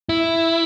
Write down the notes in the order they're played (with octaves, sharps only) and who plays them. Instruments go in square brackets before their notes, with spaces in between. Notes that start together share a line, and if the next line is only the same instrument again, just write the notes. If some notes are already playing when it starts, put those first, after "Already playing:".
[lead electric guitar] E4